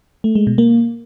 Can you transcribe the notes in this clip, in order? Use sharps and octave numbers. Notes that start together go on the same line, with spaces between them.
A3
G#3
B2
A#3